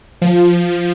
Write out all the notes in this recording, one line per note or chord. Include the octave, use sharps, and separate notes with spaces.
F3